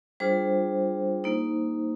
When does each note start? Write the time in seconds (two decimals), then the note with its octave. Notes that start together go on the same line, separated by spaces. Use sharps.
0.20 G3 D4 F4 G#4 C5
1.24 A#3 D#4